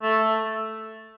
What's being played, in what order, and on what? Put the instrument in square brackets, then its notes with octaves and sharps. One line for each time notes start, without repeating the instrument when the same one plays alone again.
[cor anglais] A3